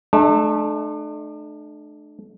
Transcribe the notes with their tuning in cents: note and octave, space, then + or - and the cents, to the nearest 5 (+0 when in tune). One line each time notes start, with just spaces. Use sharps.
A3 -30 D4 +35